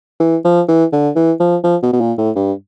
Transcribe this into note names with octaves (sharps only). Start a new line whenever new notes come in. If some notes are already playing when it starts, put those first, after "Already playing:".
E3
F3
E3
D3
E3
F3
F3
B2
B2
A#2
A2
G2